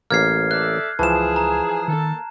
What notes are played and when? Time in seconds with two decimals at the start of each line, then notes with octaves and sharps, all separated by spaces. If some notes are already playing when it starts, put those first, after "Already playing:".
0.11 A1 A#3 F6 G#6 C7
0.51 A4 D5 E5 F#6
0.99 C#2 E3 F3 G#4 A5 E7
1.36 A#5
1.88 D#3 A#3 A4